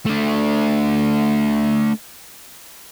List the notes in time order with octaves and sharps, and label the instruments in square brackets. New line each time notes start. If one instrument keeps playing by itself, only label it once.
[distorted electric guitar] A3 D4